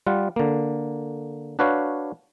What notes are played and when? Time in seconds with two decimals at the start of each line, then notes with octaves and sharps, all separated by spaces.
0.07 G3 F4 F#5
0.36 D3 A#3
1.59 D4 F#4 B4 C#5 F5